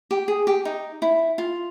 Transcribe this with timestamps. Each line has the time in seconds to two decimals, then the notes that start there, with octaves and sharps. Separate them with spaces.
0.11 G4
0.28 G#4
0.47 G4
0.65 D#4
1.02 E4
1.38 F4